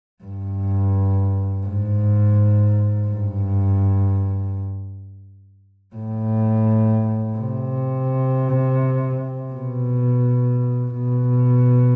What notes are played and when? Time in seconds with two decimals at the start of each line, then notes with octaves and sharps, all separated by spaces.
0.24 G2
1.67 G#2
3.10 G2
5.96 A2
7.38 C3
9.54 B2
10.96 B2